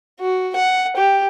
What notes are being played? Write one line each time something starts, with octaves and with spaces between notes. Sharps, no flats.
F#4
F#5
G4